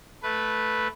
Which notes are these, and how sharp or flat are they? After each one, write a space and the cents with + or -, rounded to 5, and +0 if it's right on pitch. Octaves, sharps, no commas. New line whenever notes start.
A3 -10 B4 -5